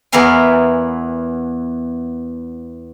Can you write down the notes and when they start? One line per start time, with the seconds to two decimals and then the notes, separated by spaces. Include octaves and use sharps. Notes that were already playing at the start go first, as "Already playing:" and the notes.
0.12 E2 B3 E4 A#4 F5 G#5